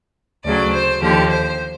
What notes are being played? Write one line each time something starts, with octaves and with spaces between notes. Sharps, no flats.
D2 C#3 F#3 D5
C5
D#2 D3 F3 G4
C5